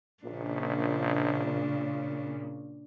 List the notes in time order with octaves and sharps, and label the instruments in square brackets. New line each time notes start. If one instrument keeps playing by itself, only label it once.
[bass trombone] A#1 [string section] A#2 C#3 [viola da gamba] D4